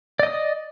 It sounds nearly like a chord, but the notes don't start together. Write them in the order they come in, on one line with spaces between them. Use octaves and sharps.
D5 D#5 D#6